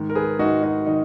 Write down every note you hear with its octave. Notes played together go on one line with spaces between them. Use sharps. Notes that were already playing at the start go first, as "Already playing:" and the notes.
Already playing: G#2 D#3
A#4
G#4 B4
G#2 D#3 D#4 F#4
D#4 F#4
D#3 D#4